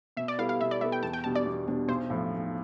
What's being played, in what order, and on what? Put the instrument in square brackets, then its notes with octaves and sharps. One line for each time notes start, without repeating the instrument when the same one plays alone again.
[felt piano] B2 [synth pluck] E5
[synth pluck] D5
[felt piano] G3 B3 E4 A4 [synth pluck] F5
[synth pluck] F5
[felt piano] B2 [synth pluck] E5
[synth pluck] D5
[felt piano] G3 B3 E4 A4 [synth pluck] E5
[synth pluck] G5
[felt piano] E2 [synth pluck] A5
[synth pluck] G5
[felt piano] B2 G3 D4 [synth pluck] A5
[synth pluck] D5
[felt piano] E2
B2 G3 D4
[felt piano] B1 [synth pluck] C5
[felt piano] A2 F3
B1